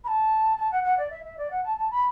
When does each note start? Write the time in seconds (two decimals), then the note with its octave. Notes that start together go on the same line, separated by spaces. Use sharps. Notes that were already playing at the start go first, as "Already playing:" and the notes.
0.04 B5
0.08 A5
0.57 A5
0.72 F#5
0.84 F#5
0.98 D5
1.10 E5
1.24 E5
1.38 D5
1.51 F#5
1.64 A5
1.77 A5
1.91 B5